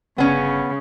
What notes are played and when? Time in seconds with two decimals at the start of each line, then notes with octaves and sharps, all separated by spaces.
0.18 G1 C#3 B3 C#4